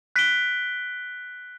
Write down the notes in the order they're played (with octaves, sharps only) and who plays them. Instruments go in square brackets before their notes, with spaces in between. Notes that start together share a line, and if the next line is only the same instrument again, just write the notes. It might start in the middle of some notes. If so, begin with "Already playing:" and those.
[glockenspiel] F#6 B6 D7 G7